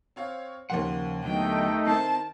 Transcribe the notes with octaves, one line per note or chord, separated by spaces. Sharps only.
C4 C#5 F5
D#2 C#3 F3 A#3 F#5 C6
D3 F#3 A3 B3 D#4 G5
D#3 C4 E4 A#4 C5 A5